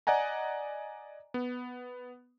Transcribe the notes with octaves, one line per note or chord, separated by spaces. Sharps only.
D5 D#5 F#5 G#5 A#5
B3